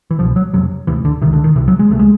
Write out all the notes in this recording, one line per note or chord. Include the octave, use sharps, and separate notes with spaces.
E3
C2 B2 F3
F#3
F2 C3 F#3
D2 C3 E3
D3
C#2 C3 D#3
D3
D#3
C2 C3 E3
F#3
G#3
C#2 C3 A3
G#3